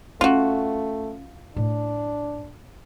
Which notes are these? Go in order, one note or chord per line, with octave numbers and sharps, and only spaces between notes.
A3 C#4 F4 F#4
A2 D4